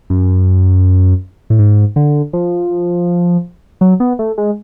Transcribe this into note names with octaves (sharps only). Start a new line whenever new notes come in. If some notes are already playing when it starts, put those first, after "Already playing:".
F#2
A2
G#2
D3
F3
F#3
B3
A3
G#3